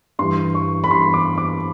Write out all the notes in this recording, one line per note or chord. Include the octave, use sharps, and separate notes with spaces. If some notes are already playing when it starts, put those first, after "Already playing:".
G2 E3 C6
C#6
B5
G2 E3 C6
D6
D6